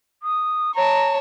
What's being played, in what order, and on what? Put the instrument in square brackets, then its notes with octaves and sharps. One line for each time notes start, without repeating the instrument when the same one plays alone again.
[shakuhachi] D#6
[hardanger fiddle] C#5 A5 [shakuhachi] A#5